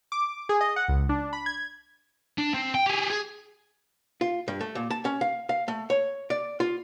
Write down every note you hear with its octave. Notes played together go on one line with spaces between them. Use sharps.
D6
G#4
D#5
F#5
C#2
D4
B5
G#6
D4
C4
G5
G4 G#4
G#4
F4
G2
A3
A#2
A5
C#4
F5
F5
A3
C#5
D5
F4